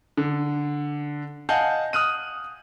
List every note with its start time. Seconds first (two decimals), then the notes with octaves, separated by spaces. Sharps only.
0.17 D3
1.49 D#5 F5 F#5 G#5 A5 G6
1.93 D#6 F6 F#6 D#7